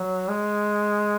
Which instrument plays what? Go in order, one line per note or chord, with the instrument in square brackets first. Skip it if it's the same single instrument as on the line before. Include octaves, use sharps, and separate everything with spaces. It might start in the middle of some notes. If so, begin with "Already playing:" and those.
Already playing: [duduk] F#3
G#3